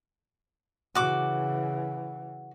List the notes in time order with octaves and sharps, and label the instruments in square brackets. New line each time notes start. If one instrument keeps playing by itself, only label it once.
[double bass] C#3 E3 [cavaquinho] F#4 D6